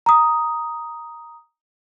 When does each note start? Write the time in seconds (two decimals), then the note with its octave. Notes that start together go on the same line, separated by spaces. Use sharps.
0.06 A#5 D#6